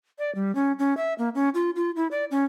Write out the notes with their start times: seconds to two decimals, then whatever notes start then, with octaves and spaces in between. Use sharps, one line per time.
0.19 D5
0.35 G3
0.55 C#4
0.79 C#4
0.97 E5
1.18 A#3
1.35 C#4
1.54 F4
1.76 F4
1.96 E4
2.11 D5
2.31 C#4